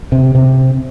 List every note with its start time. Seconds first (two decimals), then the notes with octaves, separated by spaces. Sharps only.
0.12 C3
0.35 C3